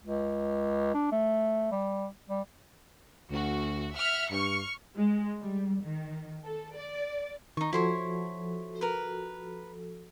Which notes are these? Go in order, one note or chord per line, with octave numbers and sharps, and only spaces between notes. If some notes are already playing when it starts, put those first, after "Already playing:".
C#2
D4
A3
G3
G3
D2 F#4
E5 F#5 F6
G2 C#6 F6 C#7
G#3
G3
D#3
A4
D5
D#3 D#4 C#6
F3 E4 F#4 A4 C5 C#5
A#4 B4